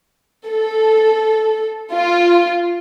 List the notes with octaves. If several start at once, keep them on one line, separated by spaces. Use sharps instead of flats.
A4
F4